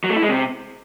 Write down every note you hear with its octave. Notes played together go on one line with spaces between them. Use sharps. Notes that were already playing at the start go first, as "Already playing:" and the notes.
F#3
A3
E4
G#3
C3